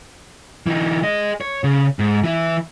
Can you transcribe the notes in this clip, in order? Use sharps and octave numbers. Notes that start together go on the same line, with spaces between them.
E3 D#4
G#4 D#5
C#5
C#3
G#2
E3 E4